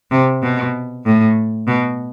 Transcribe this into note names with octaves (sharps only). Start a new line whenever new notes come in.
C3
B2
A2
B2